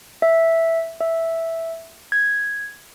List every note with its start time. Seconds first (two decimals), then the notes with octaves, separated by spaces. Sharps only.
0.22 E5
1.00 E5
2.12 G#6